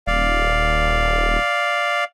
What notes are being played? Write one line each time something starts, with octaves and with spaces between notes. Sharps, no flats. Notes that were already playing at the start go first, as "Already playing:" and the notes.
D#1 D5 F5